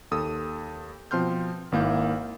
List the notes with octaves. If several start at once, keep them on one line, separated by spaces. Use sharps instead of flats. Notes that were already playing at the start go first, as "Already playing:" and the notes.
D#2 A4 D#6 E6
B2 F3 C4 C6 F6 G6
G#1 D#3 A#3 E4 F5 G6